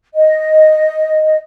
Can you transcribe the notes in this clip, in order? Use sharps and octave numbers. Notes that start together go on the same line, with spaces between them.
D#5